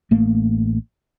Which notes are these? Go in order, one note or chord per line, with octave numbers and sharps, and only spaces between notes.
A1 A3 A#3